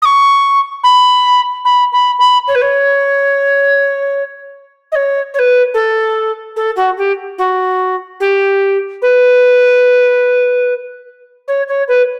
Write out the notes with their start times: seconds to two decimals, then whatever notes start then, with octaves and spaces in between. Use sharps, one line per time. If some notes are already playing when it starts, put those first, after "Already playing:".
0.02 D#6
0.05 C#6
0.83 B5
1.65 B5
1.92 B5
2.19 B5
2.47 C#5
2.55 B4
2.61 C#5
4.92 D#5
4.95 C#5
5.34 C#5
5.38 B4
5.74 A4
6.56 A4
6.76 F#4
6.97 G4
7.38 F#4
8.20 G4
9.02 B4
11.47 C#5
11.68 C#5
11.88 B4